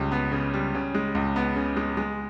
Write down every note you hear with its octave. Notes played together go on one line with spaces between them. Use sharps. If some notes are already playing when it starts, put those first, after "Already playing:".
Already playing: C#2 C#3 G3
B3
C#3
G3
C#3
G#3
C#2
B3
C#3
G#3
G#3